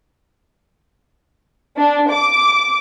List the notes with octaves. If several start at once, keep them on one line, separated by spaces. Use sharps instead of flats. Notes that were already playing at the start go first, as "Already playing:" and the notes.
D4
D6